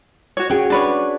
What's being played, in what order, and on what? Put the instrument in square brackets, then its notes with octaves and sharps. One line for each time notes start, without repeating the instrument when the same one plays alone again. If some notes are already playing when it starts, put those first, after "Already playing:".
[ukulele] F#4 C#5
[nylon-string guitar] C#4 F#4 G#4 [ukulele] C#5 G5
[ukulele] D4 B4 C#5